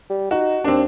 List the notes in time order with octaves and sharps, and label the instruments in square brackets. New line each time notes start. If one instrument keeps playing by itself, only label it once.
[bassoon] G3
[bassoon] D#4 [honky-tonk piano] F#4
[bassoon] D#2 [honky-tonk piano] C4 D4